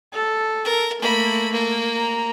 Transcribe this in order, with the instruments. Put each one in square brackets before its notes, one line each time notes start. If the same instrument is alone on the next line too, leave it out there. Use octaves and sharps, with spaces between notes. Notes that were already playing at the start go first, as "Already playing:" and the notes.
[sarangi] A4
[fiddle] A#4
[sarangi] A3 [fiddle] A#3 B5
[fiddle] A#3
[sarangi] A#5